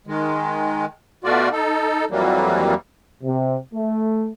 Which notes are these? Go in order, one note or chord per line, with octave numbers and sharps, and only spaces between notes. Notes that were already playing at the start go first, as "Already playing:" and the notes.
D#3 G#3
B2 A3 F4 F#4 D5
D#4 A4
F2 E3 F#3 G3 A#3
C3
A3